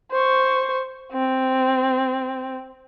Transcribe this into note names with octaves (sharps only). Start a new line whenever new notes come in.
C5 C#6
C4